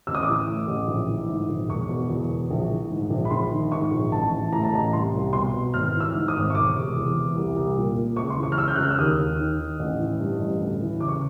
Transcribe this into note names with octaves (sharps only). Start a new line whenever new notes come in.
A1 E6
D#6
D6
E3 D#6
A2
A1
A#1
E3
G#2
A#1
E1 C#6
B2
E2
E1
A#1
E3
G#2
A#1
B5
A#1 C6
D#3
G#2 C#6
A#1
A1 A5
E3
A2 A#5
A5
A1 A#5
C2 C6
C2
B2 C6
B2
G#1 F6
E3
E6
G#2
D#6
G#1
C#6
E1 D6
C3
E2
E3
C2
C2
A#2
A#2
C#2 C#6
C6
E3
C#6
F6
C#3 E6
G6
C#2 F#6
F6
E6
D#2 D#6
D#2
D#3
D#3
A1
E3
G2
A1
D2
E3
C#3 D6
C#6